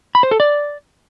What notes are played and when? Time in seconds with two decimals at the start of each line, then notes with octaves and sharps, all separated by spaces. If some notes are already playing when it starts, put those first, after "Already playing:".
0.15 B5
0.23 C5
0.31 A4
0.40 D5